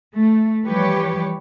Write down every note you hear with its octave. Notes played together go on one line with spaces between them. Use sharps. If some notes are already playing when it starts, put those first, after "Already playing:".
A3
E3 F3 G3 G4 B4 C#5